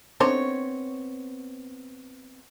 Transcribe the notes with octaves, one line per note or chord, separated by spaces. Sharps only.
B3 C4 D4 D#4 C5 C#5